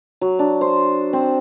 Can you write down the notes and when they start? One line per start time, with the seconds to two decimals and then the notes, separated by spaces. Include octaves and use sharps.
0.21 F#3
0.39 D4
0.61 C5
1.13 C4